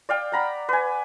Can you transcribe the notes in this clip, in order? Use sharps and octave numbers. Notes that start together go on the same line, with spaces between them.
D5 F5 G5
F#5 A#5 B5
B4 G#5